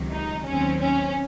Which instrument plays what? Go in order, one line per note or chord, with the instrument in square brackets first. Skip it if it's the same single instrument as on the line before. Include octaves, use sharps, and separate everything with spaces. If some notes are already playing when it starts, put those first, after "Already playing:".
Already playing: [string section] C#2 C3 D#3 F#3
D#4
D#2 D#3 F#3 C4 C#4
C#4